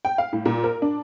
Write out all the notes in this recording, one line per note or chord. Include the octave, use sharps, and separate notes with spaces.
G5
F5
A2
A#2
A#4
D4